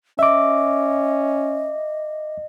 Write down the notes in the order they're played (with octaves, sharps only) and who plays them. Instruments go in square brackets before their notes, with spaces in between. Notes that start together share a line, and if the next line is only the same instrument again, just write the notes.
[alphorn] C#4 [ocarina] D#5 [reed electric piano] E5 D6